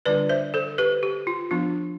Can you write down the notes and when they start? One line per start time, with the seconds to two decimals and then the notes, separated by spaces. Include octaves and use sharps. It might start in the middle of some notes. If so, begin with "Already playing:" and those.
0.05 D3 G3 D4 F4 B4 D5
0.29 C5 E5
0.54 A4 C5
0.78 G4 B4
1.03 G4
1.27 F4
1.51 F3 B3 D4 F4